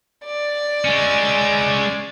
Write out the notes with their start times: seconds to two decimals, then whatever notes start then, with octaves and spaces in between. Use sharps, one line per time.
0.25 D5
0.85 G#3 C#4